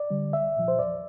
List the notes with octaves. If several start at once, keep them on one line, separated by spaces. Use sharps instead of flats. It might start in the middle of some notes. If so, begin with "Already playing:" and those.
Already playing: D5
D3 G3
C2 E5
A#2 F3
C5
E2 D5